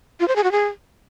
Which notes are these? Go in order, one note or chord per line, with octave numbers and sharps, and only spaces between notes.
F4
C5
G#4
F#4
G#4